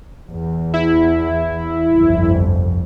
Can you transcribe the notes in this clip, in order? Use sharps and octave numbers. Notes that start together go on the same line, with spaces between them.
E2
E4
G1 C2 F2